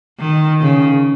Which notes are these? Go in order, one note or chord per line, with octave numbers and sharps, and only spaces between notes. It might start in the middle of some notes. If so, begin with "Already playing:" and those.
D#3
C#3